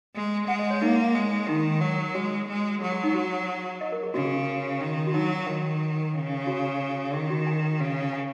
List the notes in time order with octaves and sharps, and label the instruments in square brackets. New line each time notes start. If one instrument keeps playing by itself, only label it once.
[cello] G#3
[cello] G#3 [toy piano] F#5
[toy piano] D#5
C#5
[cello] A#3 [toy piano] D#4
[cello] G#3
[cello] D#3 [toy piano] D#4
[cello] F#3
[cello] G#3 [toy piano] F#4
[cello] G#3
[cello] F#3 [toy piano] G#4
[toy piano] G#4
D#4
F#4
D#5
A#4
G#4
[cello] C#3 [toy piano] F#4
[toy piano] G#4
F#4
[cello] D#3
[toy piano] F#4
[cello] F#3 [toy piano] D#4
[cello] D#3
C#3
[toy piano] F#4
[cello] D#3 [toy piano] G#4
[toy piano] F#4
G#5
[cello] C#3
[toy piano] G#5